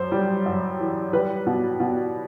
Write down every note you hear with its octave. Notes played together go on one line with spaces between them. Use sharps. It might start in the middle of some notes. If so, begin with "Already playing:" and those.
Already playing: F#2 C5
G3
F#2
E3
G3 B4
B2
B2